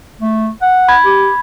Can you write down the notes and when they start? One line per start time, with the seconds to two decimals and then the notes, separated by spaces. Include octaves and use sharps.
0.20 A3
0.62 F#5
0.88 B5 G#6
1.06 G4